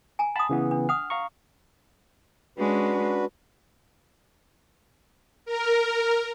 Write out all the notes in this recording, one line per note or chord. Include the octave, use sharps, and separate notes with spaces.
G#5 A#5
F#5 A5 B5 D#6
C#3 E3 B3
D4
F#5 D#6 F6
F5 A#5 C#6
G#3 C#4 D4 F#4 B4
A#4